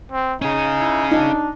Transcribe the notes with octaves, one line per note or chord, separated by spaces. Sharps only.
C4
C#4 D#4 G#4
E4
D4 D#4